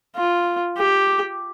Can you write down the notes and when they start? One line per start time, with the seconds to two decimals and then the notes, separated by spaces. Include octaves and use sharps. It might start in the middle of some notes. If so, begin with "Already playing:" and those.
0.16 F4
0.77 G4